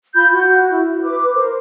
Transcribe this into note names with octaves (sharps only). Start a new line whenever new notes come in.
F4 B5 G6
F#4
E4
B4 D6
A#4 C5